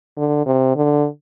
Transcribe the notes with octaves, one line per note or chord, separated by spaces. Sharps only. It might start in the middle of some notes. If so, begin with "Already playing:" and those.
D3
C3
D3